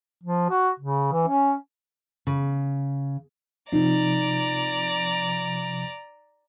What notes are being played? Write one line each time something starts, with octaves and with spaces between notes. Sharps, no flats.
F3
F#4
C#3
E3
C#4
C#3
C3 F3 D#4 D5 A#5